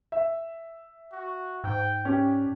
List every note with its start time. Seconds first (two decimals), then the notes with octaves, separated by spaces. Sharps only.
0.12 E5
1.12 F#4
1.64 G#2 G5
2.05 C#4 D4 G4